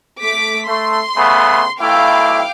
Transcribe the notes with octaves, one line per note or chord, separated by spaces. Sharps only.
A3 D6 B6
A3 C6
C#3 A3 B3
B1 A3 E4 F5 G5 D6